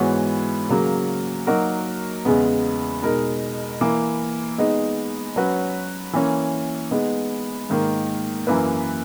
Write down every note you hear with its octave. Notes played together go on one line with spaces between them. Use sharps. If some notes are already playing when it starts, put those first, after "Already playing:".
Already playing: G#2 E3 B3 F#4 C#5
C#3 F#3 A#3
F#3 A#3 D#4 F#4 A#4
E2 C#3 G#3 B3
B2 G#3 D#4 A#4
E3 A#3 E4
G#3 B3 D#4
F#3 C#4 F#4 B4
E3 A#3 C#4
G#3 B3 D#4
G#2 D#3 A#3
F#2 E3 A#3 E4 B4